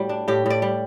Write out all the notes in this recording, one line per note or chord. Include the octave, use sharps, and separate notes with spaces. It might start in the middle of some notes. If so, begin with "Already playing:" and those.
Already playing: A2 G3 F#4
D4
A2 G4
A2 D5
G3